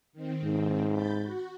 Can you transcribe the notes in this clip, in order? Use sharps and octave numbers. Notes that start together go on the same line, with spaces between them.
D#3 C4
G#2
B5 G6 A6
F#4